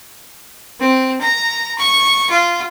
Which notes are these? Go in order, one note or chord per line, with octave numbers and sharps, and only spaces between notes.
C4
A#5
C#6
F4